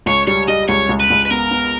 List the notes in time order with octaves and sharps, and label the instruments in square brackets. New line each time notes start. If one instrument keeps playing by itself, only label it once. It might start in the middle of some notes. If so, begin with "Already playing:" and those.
[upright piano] C#2 [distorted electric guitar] C#5
[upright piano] G3 [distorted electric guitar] C#5
[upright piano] G3 [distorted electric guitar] D#5
[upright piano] C#2 [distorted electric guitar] C#5
[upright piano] C#2
[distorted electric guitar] B4
[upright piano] C#2
[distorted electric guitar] B4
[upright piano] B3 [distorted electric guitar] A#4
[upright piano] B3